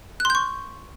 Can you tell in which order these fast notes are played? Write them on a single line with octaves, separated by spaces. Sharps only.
F#6 C6 G6 C#6